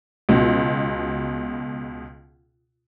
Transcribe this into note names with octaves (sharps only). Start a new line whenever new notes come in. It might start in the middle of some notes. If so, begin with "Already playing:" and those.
C#2 B2